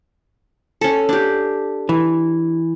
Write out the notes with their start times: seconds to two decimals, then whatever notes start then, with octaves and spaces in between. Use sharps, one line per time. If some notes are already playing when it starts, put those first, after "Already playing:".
0.81 C#4 A4
1.09 D4 G4
1.89 E3